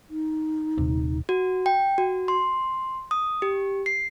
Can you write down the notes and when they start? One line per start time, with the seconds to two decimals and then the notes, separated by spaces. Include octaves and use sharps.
0.10 D#4
0.78 D#1 C3
1.29 F#4
1.66 G5
1.98 F#4
2.28 C6
3.11 D#6
3.42 G4
3.86 C7